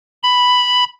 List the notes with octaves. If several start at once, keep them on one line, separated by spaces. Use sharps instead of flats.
B5